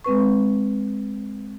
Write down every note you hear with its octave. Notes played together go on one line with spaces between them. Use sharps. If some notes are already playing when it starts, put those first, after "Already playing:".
G#3 C4 B4 C#6